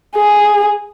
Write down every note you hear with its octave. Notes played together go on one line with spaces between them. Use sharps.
G#4